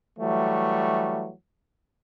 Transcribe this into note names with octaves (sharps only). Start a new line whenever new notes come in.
E3 F#3 G3 A3